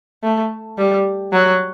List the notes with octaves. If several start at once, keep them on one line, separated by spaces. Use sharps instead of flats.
A3
G3
F#3